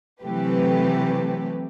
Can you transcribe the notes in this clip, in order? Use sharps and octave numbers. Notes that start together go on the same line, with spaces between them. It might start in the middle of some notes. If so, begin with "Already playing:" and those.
C3 E3 F#3 A3 G4 B4